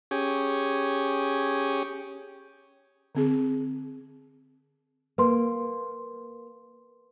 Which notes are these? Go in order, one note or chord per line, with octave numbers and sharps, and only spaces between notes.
C#4 G4 G#4
D3 C4 G#4
A#3 B4 C6